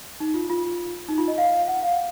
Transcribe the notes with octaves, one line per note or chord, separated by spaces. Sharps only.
D#4
F4
F4
D#4
F4
D#5
F5
F#5
F5